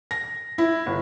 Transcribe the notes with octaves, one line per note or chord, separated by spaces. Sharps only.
A#6
E4
G1